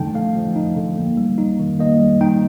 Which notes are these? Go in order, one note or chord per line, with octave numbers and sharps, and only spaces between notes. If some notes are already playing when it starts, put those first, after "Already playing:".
Already playing: D3 F3 A3 D#4 G5 A5
A3 F5
F3
D#4
D3
A#3
G3
D#4
D#3
A#3 D#5
G3
D#4 G5